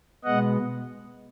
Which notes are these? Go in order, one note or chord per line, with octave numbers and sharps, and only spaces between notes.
B2 G#3 B3 D#5 F#5